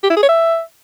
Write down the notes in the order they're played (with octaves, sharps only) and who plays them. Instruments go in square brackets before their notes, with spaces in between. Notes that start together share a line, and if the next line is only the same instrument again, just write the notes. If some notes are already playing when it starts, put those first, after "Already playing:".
[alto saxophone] G4
E4
G#4
C#5
E5